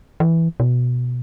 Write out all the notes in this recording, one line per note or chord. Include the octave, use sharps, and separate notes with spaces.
E3
B2